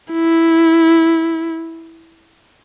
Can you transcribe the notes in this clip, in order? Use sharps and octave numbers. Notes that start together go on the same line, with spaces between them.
E4